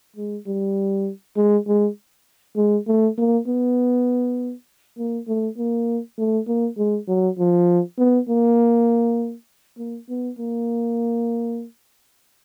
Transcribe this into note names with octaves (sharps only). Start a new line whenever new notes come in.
G#3
G3
G#3
G#3
G#3
A3
A#3
B3
A#3
A3
A#3
A3
A#3
G#3
F#3
F3
B3
A#3
A#3
B3
A#3